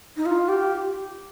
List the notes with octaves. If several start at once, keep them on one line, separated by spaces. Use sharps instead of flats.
D#4
F4
G4